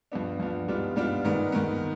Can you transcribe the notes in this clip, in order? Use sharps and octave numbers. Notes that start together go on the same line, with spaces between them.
G2 F3 B3 D4
G2 F3 B3 D4
G#2 G3 B3 D4 F4
G#2 G3 B3 D4 F4
G#2 D#3 B3
G#2 D#3 B3